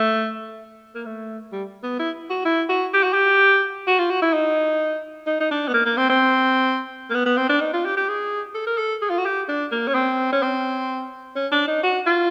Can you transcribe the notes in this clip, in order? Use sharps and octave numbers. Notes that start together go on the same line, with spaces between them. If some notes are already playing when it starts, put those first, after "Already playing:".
Already playing: A3
A#3
A3
G3
B3
E4
F#4
E4
F#4
G4
F#4
G4
F#4
F4
F#4
E4
D#4
D#4
D#4
D4
B3
A#3
A#3
C4
C4
A#3
B3
B3
C4
D4
D#4
F4
G4
G4
G#4
A4
A#4
A4
G#4
F4
F#4
G4
D4
A#3
C#4
C4
C#4
C4
C#4
D4
D#4
F#4
F4